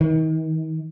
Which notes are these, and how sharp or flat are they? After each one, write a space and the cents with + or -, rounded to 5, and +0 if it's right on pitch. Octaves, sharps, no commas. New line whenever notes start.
D#3 +35